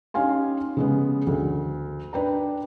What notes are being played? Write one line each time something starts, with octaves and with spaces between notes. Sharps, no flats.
C#4 D#4 G4 F5 G#5 C6
C#3 G#3 B3
D2
D4 B4 G5 A#5